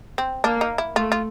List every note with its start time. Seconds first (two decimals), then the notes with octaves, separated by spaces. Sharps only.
0.18 C4
0.44 A#3 D4
0.61 D#4
0.78 E4
0.96 A3 F4
1.12 F4